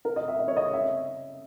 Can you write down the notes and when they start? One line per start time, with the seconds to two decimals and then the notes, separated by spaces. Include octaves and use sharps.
0.05 A#4
0.16 D#5
0.28 E5
0.39 D#5
0.48 C#5
0.57 D#5
0.73 E5